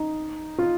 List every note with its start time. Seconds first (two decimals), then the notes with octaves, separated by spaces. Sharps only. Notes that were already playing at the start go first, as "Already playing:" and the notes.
Already playing: D#4
0.58 F4